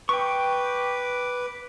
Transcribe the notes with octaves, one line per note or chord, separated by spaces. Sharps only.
B4 G5 C#6 D6